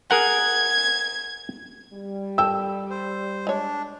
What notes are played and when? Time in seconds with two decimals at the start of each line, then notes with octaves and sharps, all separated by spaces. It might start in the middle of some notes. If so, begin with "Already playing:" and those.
0.11 G#4 A#4 F#5 G#6
1.94 G3
2.38 A4 G5 E6
2.90 C5
3.47 G#3 D4 C#5